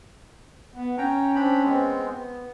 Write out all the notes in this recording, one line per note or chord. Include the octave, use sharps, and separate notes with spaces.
B3
C#4 G5 A#5
C4 D4 B5
G#3 B3 C4
B3